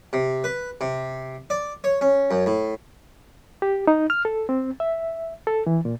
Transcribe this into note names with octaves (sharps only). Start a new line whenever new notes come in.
C3
B4
C3
D5
C#5
C#4
F#2
A2
G4
D#4
F6
A4
C4
E5
A4
E3
A#2